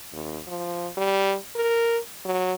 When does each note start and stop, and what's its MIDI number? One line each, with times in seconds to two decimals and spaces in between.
0.13 0.39 39
0.47 0.88 53
0.97 1.35 55
1.56 1.98 70
2.25 2.53 54